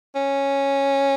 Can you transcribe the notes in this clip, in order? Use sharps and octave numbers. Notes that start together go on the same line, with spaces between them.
C#4